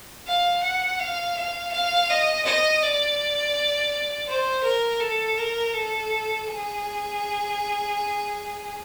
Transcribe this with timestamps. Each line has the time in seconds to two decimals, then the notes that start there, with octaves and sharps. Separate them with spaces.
0.27 F5
0.63 F#5
0.99 F5
1.37 F5
1.72 F5
2.10 D#5
2.45 D#5
2.82 D5
4.27 C5
4.64 A#4
5.00 A4
5.37 A#4
5.74 A4
6.46 G#4